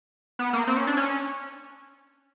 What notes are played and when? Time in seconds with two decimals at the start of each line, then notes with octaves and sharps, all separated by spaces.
0.39 B3
0.53 A#3
0.67 C4
0.77 C#4
0.87 D4
0.97 C#4